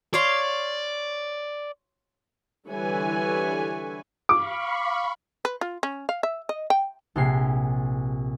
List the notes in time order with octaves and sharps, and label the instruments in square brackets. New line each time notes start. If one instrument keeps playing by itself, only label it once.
[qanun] C#5 F5 C6 [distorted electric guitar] D5
[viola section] D3 E3 G3 B4 C#5 G#5
[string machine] F5 B5 C#6 [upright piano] D6
[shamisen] B4
F4
C#4
F5
E5
D#5
G5
[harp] A#1 C3 G4 G#4 C7